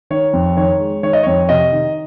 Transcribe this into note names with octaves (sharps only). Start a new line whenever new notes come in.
D#3 C#5
F2
D#3 C#5
G#3
D#3 C#5
D#5
F2 C#5
C3 D#5
D#3